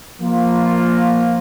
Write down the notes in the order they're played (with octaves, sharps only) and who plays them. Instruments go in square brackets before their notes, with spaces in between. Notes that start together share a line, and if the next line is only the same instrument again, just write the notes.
[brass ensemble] F3 A#3 F4